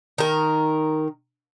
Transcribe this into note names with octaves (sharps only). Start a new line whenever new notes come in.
D#3 A#4